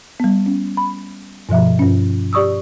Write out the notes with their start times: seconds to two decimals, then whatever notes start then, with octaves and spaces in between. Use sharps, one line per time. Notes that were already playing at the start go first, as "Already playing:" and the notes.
0.20 G3 B3
0.46 C#4
0.77 B5
1.49 G2 B2 F3 E5
1.79 G2 C#4
2.33 G4 D5 C#6 D#6 E6